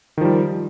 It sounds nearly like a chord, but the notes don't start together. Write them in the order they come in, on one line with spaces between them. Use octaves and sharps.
D#3 F3 G3